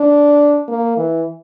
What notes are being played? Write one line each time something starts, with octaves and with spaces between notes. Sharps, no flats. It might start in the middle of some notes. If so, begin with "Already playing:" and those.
Already playing: D4
A#3
E3